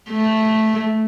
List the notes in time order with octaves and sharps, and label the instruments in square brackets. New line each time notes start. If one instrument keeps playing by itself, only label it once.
[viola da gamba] A3